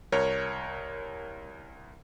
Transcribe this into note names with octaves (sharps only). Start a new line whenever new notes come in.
C2 A#4 C#5